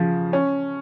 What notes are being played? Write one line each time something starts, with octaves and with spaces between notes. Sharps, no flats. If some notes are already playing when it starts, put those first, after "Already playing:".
Already playing: C#3 F3
C#4